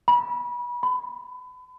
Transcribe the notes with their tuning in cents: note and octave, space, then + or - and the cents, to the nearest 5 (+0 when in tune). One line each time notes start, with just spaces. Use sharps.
B5 -30
B5 +30